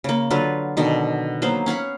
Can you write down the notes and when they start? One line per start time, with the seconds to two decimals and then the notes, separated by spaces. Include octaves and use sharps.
0.04 C#3 A#3
0.31 D3 F#3 F4 B4
0.77 B2 D3 D#3
1.42 F#3 A#3 B3 C5
1.66 C#4 F5 F#5 B5